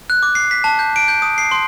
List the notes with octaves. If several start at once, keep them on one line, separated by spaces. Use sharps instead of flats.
F#6
D6
C7
B6
A5
G6
D7
G6
D#6
C7
C6